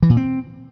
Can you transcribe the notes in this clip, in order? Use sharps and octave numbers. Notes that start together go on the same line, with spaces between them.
E3
A#2
C4